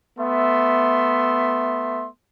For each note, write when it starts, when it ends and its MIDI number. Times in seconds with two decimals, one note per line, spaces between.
0.18 2.07 57
0.18 2.07 59
0.18 2.07 76
0.18 2.07 84